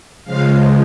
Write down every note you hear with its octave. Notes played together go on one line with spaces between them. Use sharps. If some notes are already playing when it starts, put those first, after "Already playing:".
C#3 F3 G#3 F5